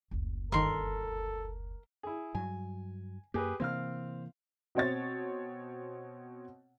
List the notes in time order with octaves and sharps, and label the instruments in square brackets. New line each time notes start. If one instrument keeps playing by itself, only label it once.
[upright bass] F#1 D2
[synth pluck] G1 D#3 [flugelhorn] A4 [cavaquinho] A#4 C6
[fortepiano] E4 G#4
[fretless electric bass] G2 F#3 [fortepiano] G#5
[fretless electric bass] F#2 A#3 [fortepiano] G4 G#4 B4
[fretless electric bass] C3 E3 A#3 [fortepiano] C4 F5 F6
[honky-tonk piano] B2 C4 C#5 A6